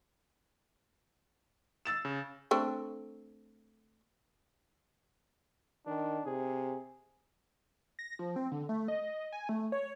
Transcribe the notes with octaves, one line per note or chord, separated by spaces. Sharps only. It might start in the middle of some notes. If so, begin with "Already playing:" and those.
E6 A6 E7
C#3
A3 C4 D4
D#3 D4
C3 G#4
A#6
F3
C4
D3
A3
D#5
G#5
A3
C#5